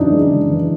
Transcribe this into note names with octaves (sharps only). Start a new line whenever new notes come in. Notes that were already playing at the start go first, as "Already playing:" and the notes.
Already playing: F#2 C#3 E3 D4 D#4
G#3
C#3
E3